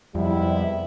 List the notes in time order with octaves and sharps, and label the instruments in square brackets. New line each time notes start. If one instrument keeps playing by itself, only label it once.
[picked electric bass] F2 [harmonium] C3 G#3 B3 [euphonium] G3 [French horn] E4